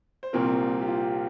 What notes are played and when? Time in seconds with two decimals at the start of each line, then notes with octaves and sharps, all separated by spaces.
0.23 C5
0.33 C2 A#2 F3 C4 A#4
0.60 F4
0.82 G4
0.87 F4